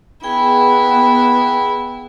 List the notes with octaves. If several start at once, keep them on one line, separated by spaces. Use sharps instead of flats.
B3 E4 G#4 G5 G#5